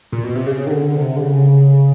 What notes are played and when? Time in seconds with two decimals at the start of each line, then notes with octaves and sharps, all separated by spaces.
0.12 A#2
0.24 B2
0.35 C3
0.47 C#3
0.66 D#3
0.71 D3
0.96 C3
1.16 D3
1.22 C#3